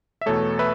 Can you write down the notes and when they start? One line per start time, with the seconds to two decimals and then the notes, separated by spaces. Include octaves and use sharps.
0.21 E5
0.26 E2 B2 A3 A4 C#5
0.59 B4 E5